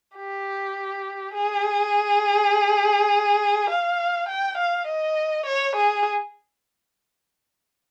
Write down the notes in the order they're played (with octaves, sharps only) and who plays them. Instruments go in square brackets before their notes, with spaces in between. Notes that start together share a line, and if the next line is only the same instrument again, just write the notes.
[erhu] G4
G#4
F5
G5
F5
D#5
C#5
G#4